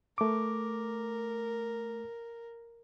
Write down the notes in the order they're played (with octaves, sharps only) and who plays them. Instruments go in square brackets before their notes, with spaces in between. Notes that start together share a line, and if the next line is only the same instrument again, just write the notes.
[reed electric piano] A3 D6 [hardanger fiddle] A#4